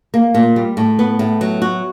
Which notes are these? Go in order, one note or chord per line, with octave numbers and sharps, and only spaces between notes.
A#3
A#2
G3
A2
B3
A2
F#3
F#4